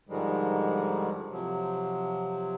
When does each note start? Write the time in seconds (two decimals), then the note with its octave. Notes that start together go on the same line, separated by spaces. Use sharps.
0.09 G#2 D3 D#3 F3 G3 G#3
1.29 C3 F3 F#3